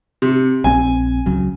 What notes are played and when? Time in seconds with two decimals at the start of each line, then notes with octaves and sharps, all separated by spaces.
0.22 C3
0.64 A#1 C4 G#5
1.26 C#2 C#3 F#3